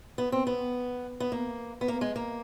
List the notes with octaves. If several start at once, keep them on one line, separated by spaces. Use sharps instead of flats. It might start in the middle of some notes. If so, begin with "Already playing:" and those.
B3
C4
B3
B3
A#3
B3
A#3
G#3
A#3